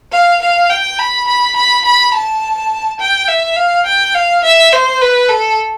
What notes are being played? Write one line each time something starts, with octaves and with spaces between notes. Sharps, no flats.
F5
F5
G5
B5
B5
B5
B5
A5
G5
E5
F5
G5
F5
E5
C5
B4
A4